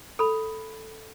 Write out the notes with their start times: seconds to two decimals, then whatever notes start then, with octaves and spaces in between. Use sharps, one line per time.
0.19 A4 B5